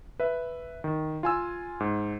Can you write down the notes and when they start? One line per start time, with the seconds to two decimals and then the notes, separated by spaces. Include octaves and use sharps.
0.20 B4 E5
0.84 D#3
1.23 F4 G#5 E6
1.80 G#2